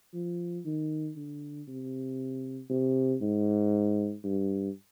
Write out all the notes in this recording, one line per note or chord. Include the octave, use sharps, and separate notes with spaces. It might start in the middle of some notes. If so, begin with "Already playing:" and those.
F3
D#3
D3
C3
C3
G#2
G2